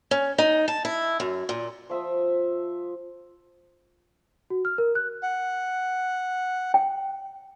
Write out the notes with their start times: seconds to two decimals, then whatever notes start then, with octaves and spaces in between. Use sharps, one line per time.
0.11 C#4
0.38 D#4
0.68 A5
0.85 E4
1.20 F#2
1.49 A#2
1.89 F3 E5 D#6
4.50 F#4
4.65 F6
4.78 A#4
4.95 F#6
5.23 F#5
6.74 G5